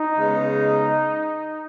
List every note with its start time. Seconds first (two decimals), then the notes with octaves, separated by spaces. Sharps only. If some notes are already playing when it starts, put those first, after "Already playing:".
Already playing: D#4
0.18 C#3 G#3 B3